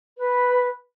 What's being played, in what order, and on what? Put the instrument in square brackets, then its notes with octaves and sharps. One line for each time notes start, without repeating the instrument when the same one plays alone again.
[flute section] B4